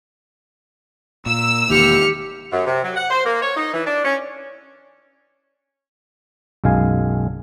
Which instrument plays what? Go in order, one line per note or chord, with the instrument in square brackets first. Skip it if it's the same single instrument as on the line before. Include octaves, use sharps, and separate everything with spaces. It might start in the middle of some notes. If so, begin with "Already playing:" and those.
[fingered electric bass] A#2 [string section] E6
[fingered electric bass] E1 D#3 A#3 [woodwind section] G4 [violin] F6 C#7
[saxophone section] F#2
C3
F#3
F#5
C5
A#3
C#5
D#4
E3
D4
C#4
[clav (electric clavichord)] B1 F#2 G#3 F5 G#5